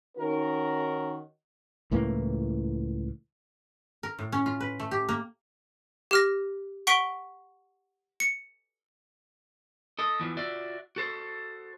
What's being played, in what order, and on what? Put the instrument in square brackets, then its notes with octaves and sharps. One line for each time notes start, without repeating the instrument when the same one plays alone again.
[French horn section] D#3 C#4 D#4 F#4 A#4
[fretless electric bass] C#2 A2 E3 A#3
[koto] A#4
A2
C#4
F4
B4
A3
G4
A#3
[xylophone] G4 F6 A#6
F#5 C#6 B6 D7 G7
C#7
[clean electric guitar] A4 D#5
E2 E3 F3
F4 F#4 D5 E5
F#4 A4 C5